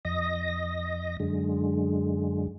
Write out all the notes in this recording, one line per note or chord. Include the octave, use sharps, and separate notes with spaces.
F2 D#5 A#6
F#2 D3 G#3